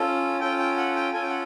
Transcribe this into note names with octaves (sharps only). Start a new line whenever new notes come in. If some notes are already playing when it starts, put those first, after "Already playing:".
Already playing: C#4 F4 A4
C#4 F4 A4 G5
G5
F#5
G5
C#4 F4 A4 G#5
G5
F#5